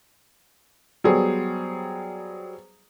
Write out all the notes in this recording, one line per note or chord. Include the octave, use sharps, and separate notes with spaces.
F#3 G3 B3 G#4 C5